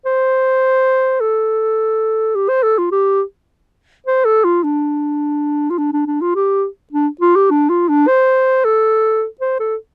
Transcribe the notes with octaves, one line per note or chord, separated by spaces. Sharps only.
C5
A4
G4
C5
A4
F4
G4
C5
A4
F4
D4
F4
D4
D4
D4
F4
G4
D4
F4
G4
D4
F4
D4
C5
A4
C5
A4